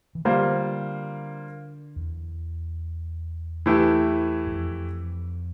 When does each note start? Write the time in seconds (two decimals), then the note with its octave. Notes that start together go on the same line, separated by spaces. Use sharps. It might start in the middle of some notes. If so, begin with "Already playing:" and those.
0.15 E3
0.25 D3 G3 A#3 F4 C5
1.96 E2
3.66 E3 A3 E4 G4
4.47 G2
4.51 F2